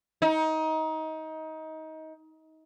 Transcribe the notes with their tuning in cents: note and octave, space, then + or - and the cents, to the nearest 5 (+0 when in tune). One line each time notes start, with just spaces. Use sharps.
D#4 +25